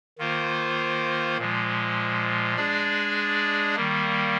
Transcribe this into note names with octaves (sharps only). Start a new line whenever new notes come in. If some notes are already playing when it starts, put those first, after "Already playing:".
D#3 A#3 F4 C5
A#2 F3 G#3
G#3 D4 G#4 D5
D#3 G3 A#3